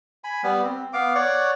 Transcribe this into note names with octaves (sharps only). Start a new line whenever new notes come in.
G#5 B5
G3 B3
C4
B3 F5 D6
C#5 D5 F#5 C#6